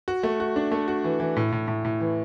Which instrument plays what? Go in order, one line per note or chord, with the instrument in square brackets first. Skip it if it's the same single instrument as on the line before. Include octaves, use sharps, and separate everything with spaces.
[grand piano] F#4
A3
F#4
D4
A3
F#4
E3
E3
A2
A2
A2
A2
E3